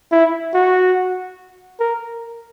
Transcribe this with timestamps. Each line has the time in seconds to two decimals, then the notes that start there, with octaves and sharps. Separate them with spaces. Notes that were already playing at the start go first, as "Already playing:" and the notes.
0.12 E4
0.54 F#4
1.80 A#4